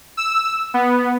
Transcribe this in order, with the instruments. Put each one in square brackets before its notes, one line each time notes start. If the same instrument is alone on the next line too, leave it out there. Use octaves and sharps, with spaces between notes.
[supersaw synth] E6
B3